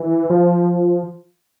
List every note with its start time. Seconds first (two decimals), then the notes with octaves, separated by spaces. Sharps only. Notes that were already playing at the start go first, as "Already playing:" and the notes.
Already playing: E3
0.30 F3